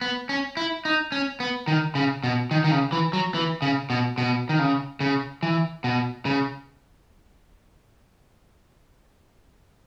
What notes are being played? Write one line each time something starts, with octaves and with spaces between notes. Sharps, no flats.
B3
C#4
E4
D#4
C#4
B3
D#3
C#3
B2
D#3
D#3
C#3
E3
F#3
E3
C#3
B2
B2
D#3
C#3
C#3
E3
B2
C#3